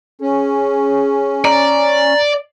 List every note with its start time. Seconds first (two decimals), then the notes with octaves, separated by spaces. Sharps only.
0.21 C#4 G#4
1.45 D5 A#5